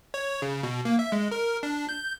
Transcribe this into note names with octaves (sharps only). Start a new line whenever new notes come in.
C#5
C#3
B2
A#3
E5
G#3
A#4
D4
G6